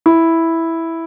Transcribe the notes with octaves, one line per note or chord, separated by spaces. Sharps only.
E4